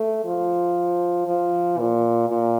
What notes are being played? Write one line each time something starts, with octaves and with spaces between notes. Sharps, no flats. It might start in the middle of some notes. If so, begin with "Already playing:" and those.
Already playing: A3
F3
F3
A#2
A#2